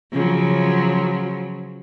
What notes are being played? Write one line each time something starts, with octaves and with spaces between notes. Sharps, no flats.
C#3 F3 F#3